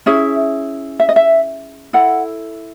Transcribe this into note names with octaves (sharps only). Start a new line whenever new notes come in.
C#4 E4 G#4 E5
E5
D#5
E5
E4 A4 F#5